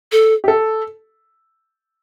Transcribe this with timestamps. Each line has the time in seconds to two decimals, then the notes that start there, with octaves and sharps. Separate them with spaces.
0.12 A4
0.44 G4
0.48 A4